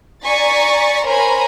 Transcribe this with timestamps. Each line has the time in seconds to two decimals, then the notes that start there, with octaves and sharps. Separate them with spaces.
0.25 D5 G#5 A#5 C#6 A6 B6
1.06 A#4 C5 C#5 G#5 A#5 B5